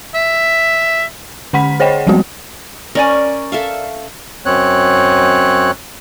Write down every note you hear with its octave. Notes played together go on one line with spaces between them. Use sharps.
E5
D3 C#4 F#5 B5 B6
G#4 C5 C#5 D#5 F#5 G5
F3 G3 G#3 B3 C4 F#4
C#4 A#4 D5 G#5
A4 E5 F5
F#2 C4 C#5 F#6